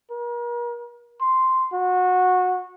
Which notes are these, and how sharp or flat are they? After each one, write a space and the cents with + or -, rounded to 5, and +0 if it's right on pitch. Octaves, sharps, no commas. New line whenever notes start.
A#4 +40
C6 -5
F#4 -20